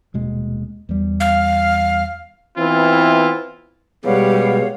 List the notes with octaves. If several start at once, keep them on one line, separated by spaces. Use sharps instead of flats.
D#1 B2 G#3
E2 G3
F5
E3 B3 C4 E4 F4
B2 G3 G#3 B4 C#5 F5 F#5